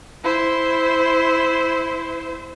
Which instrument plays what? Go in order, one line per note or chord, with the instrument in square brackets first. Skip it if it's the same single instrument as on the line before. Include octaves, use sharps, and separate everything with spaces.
[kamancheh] E4 C5